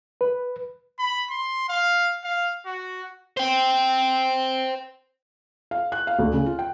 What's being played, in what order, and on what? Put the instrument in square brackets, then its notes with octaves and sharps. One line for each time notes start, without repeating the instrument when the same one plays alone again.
[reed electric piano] B4
[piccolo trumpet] B5
C6
F5
F5
F#4
[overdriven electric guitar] C5 G5
[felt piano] F5
F#6
F5
D2
C#3
F4
G5